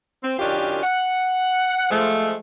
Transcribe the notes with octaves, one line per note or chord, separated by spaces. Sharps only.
C4
F#2 D#3 C#4 D4 F4 G4
F#5
F3 G#3 A3